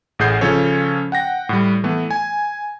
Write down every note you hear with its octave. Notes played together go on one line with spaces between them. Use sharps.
A1 A2 G#4 F#5 G6 C7
C#3 F3 C#4 A4 C#5
F#5 G5 A#6
A2 G3
E3 A3 B3
G#5